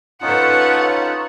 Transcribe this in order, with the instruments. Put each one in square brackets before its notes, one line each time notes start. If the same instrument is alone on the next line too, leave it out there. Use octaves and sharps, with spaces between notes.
[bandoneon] C#4 D#4 F4 [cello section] A4 B4 C#5 [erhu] F#5